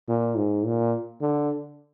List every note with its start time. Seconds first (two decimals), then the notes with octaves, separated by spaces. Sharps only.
0.08 A#2
0.36 G#2
0.66 A#2
1.21 D3